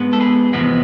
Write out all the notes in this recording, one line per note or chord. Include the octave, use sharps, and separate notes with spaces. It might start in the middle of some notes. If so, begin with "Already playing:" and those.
Already playing: G#2 G#3 B3
A4
G#4 B4
E2 C3 F3 G#3 B3